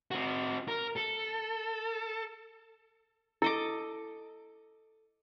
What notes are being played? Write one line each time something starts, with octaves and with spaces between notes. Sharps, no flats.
C4 F#4
A#4
A4
E4 A4 D#5 D6